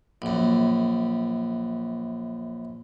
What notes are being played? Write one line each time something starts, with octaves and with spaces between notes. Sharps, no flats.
A#1 F#2